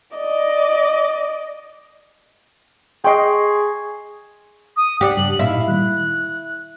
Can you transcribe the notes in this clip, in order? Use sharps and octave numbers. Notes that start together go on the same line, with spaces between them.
D5 D#5
G#4 D#5 G5 C6 C#6 C7
D#6
D4 G4 F#5
C#2 G2 F#7
A#2 A3 D#4 E4 F5
A#2 D#3 G3 F#6